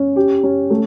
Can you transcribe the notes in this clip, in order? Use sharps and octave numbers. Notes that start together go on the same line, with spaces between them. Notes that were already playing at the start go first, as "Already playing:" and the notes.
Already playing: C#4
G4
C#4
A3